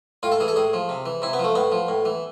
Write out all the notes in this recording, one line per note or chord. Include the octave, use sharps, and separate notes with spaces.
A2 F4
A4
E3 G#4
A4
A2 G#4
F3
C3
E3
C3 E4
B3
F3
A3
A2 B3
F3
A2
E3